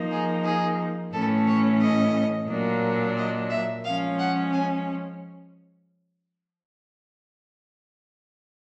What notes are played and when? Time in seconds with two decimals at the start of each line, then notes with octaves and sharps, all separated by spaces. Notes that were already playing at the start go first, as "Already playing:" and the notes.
Already playing: F3 A#3 D#4
0.11 G#4
0.44 G#4
1.12 A2 E3 A3 C#4 A4
1.47 C#5
1.81 D#5
2.48 A#2 F#3 A#3 D4
3.17 D#5
3.50 E5
3.84 F3 G#3 C#4 F5
4.18 F#5
4.52 G#5